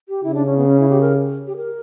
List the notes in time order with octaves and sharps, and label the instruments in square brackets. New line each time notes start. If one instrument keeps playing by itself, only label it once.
[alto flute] G4
[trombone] C#3 [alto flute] E4
[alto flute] D4
C#4
B3
C#4
E4
G4
A#4
G4
A#4